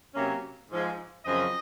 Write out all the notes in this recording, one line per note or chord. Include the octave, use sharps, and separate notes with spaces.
C3 F#3 A#3 C#4
G#2 F3 G#3
F#2 C#3 F3 C4 D#5